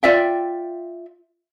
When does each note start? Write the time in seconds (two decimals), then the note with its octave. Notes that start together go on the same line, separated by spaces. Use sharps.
0.03 F4 D5 E5 G5